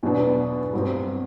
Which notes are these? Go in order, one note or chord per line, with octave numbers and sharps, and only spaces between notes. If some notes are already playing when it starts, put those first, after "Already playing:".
E2 B2 F#3 B3 D4
G2 F#3 C4